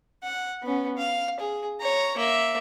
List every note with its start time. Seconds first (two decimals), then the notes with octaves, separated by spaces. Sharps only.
0.23 F#5
0.63 B3 C#4
0.98 F5
1.40 G#4
1.80 C#5 A#5
2.17 A#3 E5